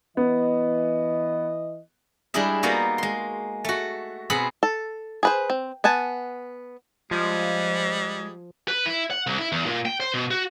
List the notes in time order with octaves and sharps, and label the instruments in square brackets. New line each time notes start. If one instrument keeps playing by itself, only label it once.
[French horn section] E3 D#5 [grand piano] B3
[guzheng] G3 G#3 D4 E4 G#4 E5
G3 A#3 B3 D#4 F#4
G#3 C6
A3 F#4
B2 C4 G#4 F#5 B5
[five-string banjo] A4
G#4 B4 C5
C4
B3 F#5 G#5 A5
[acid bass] F3 [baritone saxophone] G3 [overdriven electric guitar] G#3
[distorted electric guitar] B4
E4
F#5
C2
E4
E2
A#2
G5
C5
B2
F#4